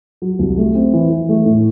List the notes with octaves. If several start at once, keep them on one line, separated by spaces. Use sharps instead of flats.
F#3
C2
A3
C4
E3
E3
A3
A2